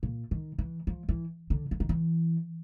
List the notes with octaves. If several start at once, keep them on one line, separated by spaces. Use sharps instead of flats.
A#2
D#3
E3
F3
E3
D3
E3
D#3
E3